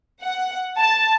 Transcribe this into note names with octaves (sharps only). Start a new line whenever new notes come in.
F#5
A5